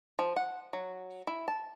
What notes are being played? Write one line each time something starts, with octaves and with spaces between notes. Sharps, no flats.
F3
F#5
F#3
E4
A5